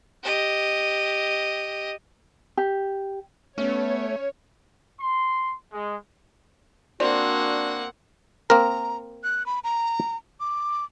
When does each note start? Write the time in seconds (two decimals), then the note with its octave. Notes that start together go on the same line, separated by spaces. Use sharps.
0.23 G4 D#5
2.57 G4
3.58 A3 B3 C#4 C#5
5.00 C6
5.72 G#3
7.00 A#3 C4 D4 F#4 D5 F#5
8.50 A#3 C4 A#4 A#5
9.24 F#6
9.46 B5
9.64 A#5
10.40 D6